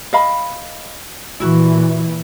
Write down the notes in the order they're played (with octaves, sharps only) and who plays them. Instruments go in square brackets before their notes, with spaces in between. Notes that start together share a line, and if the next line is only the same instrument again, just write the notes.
[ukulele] D#5 F5 B5
[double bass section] A#2 E3 [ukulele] E4 F#4